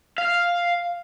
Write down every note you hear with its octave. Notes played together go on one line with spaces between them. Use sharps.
F5